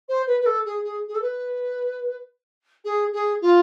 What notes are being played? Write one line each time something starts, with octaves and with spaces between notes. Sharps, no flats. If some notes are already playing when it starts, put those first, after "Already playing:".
C5
B4
B4
A4
G#4
G#4
G#4
A4
B4
G#4
G#4
F4